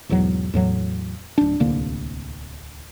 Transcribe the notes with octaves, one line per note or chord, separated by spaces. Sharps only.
B1 E2 G#2 F#3
E2 A2 F#3
D1 D4
D1 C2 D3 A#3